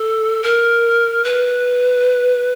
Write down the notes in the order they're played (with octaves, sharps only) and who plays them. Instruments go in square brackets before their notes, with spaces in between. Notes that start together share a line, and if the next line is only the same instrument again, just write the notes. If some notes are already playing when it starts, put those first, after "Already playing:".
Already playing: [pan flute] A4
A#4
B4